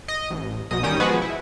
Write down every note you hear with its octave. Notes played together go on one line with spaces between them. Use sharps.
D#5
A1
B1 B2 D#5 D#6
A1 D#3 G3 C#4 G5 D#6
F3 G#3 B3 F#4 G#4 B4
E4